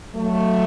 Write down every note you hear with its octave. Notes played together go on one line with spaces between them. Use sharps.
F#3 A3